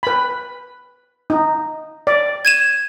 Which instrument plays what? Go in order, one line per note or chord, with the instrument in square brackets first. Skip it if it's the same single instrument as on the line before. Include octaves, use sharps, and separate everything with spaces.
[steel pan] B4 B5
D#4
D5
[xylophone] G#6 D#7 E7